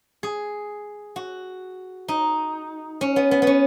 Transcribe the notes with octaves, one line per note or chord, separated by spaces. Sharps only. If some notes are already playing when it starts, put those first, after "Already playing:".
G#4
F#4
D#4
C#4
B3
B3
B3 C#4